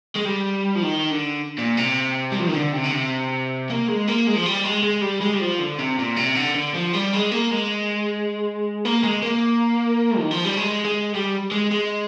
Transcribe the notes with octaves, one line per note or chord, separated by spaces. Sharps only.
G#3
G3
F3
D#3
D3
A#2
C3
G3
F3
D#3
D3
C3
D3
C3
A#3
G#3
A#3
G#3
F3
G3
G#3
G#3
G3
G#3
G3
F3
D3
C3
A#2
C3
D3
D3
F3
G3
G#3
A#3
G#3
A#3
G#3
A#3
D#3
F3
G3
G#3
G#3
G3
G#3
G#3